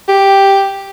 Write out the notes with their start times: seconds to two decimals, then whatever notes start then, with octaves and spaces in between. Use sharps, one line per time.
0.08 G4